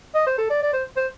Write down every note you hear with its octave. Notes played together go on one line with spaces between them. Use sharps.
D#5
C5
A4
D5
D5
C5
C5